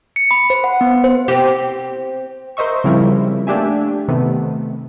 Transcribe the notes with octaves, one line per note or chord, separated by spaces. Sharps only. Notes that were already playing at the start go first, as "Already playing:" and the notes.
C#7
B5
C5
F#5
B3
C5
C4 G4
A#4 C5 D#5 E5 C#6
C#3 F3 G3 C4 E4 A#4
A3 A#3 D4 G4 E5 G#5
C3 D#3 A3 B3